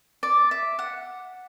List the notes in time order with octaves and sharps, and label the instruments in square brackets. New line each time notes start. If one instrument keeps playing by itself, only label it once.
[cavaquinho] D5
E5
F#5